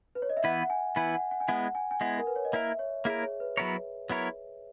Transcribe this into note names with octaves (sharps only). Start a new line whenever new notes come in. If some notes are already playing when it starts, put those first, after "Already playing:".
B4
C#5
D#5
E5
E3 B3 E4 B4 F#5
F#5
G#5
E3 B3 E4 B4 G#5
F#5
F#5
G#5
G#3 B3 E4 F#5
G#5
G#5
G#3 B3 E4 F#5
A#4
B4
C#5
D#5
A#3 E4 A#4 E5
C#5
A#3 E4 G#4 A#4
C#5
B4
F#3 B3 E4 A#4 C#5
F#3 B3 E4 A#4 C#5